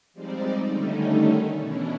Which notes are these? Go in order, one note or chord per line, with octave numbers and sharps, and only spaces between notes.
F3 G3 G#3 C4 D#4 D5
D3 D#3 G3 A3 C#4 D#4
B2 E3 C#4 D4 E4